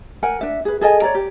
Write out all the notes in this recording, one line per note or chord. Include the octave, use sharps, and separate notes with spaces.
A#4 F#5 G#5
D4 E5
G#4 B4
G#4 A4 D#5 G#5
C#5 D5 A#5
G4